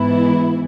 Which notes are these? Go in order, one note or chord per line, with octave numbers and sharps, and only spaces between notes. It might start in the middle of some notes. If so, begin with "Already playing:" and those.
Already playing: G#2 E3 B3 E4